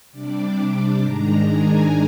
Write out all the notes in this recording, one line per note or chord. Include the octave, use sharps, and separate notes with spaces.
C3 G3 D4 D5
G#2 D#3 G#3 D4 A#5
G#5